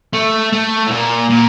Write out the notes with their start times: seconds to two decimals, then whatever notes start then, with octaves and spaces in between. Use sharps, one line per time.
0.13 A3
0.52 A3
0.86 A2
0.91 A#2
1.30 A#2